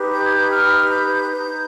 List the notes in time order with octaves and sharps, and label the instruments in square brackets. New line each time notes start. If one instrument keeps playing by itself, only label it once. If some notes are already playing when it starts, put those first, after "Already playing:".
Already playing: [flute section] D#4 G4 B4
G6
G#6
G6
F6
G6
D#4 B4 G6